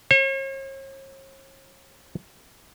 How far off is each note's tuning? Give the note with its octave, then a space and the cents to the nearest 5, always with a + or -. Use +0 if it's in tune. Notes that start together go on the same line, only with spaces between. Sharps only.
C#5 -45